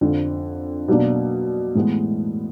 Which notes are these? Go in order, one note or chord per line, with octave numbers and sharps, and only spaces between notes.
F2 D3 F3
B2 F#3 A#3 D4
A2 E3 G#3 B3